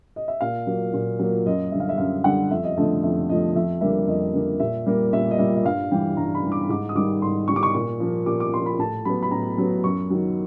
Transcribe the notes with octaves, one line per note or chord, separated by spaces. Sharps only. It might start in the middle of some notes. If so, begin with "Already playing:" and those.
D#5
E5
A#2 F5
F#3 A#3
A#2
F#3 A#3
F#2 D#5
D3 G3 E5
F5
E5
F#2 F5
D3 G3 F#5
F2 E5
D#5
D3 F3 A3 D#5
F2 E5
D3 F3 A3 D#5
F2 E5
D3 G3 A#3 E5
F2 D#5
D3 G3 A#3
A#2 E5
G3 A#3
A#2 E5
D#5
G3 A#3 E5
E5
G2 F5
E3 G3 G5
G2 A#5
B5
E3 G3
D6
G#2 D6
D#6
D#3 G3 D6
G#2 C6
D#3 G3 C#6
D6
C#6
A#2 C#6
F3 A#3
A#2 D6
D6
F3 A#3 C6
B5
A2 A5
F#3 B3 B5
B5
A2 A#5
F#3 B3
F#2 C#6
D#3 F#3